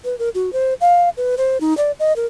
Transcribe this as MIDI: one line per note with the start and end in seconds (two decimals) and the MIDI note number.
0.04 0.17 71
0.19 0.29 70
0.34 0.52 66
0.53 0.74 72
0.81 1.09 77
1.17 1.35 71
1.37 1.60 72
1.60 1.76 63
1.77 1.91 74
1.99 2.15 75
2.16 2.26 70